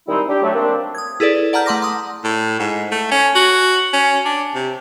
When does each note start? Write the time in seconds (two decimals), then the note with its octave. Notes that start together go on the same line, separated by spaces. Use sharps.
0.08 D#3 G3 G#3 C4 D#4 E4
0.28 D4 G4 G5
0.42 F#3 A3
0.54 A#3 C4 D4
0.95 D#6 G#6
1.20 E4 G#4 A4 B4 D5
1.53 D5 F#5 A5 A#5 F6 G6
1.66 A3 F#5 C6 D6 A#6
1.82 C6 D#6
2.24 A2
2.59 G#2
2.92 A3
3.11 C#4
3.35 F#4
3.93 C#4
4.25 D4
4.55 C3